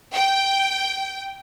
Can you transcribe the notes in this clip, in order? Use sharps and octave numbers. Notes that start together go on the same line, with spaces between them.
G5